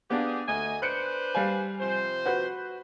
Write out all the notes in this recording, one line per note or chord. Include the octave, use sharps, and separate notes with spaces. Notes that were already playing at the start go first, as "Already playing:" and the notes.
B3 D4 G4 G#4 F5
D2 D#5 G#5
D4 B4 C5 F#6 C#7 D7
G3 F5 G#5
C3 F3 C5
F#4 B4 G6